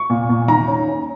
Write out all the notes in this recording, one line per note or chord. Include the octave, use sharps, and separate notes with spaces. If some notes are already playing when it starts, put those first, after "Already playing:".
Already playing: C#6
A#2
A#2
D#3 A#5
C#4
C#4